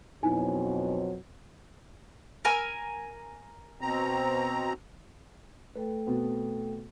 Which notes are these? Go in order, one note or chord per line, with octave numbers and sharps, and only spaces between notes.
F2 B2 F#3 D#4 E4 G#5
A#4 G#5 E6
B2 C4 A#5
A3 A4 B4 G5
B2 B3 C4